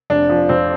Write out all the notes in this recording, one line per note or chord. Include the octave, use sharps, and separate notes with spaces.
F1 D4
F3
F2 C4